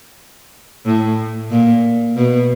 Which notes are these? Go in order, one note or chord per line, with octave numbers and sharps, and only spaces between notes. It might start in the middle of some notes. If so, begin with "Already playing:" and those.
A2
A#2
B2